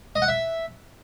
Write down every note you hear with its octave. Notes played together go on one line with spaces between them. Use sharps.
D#5
F#5
E5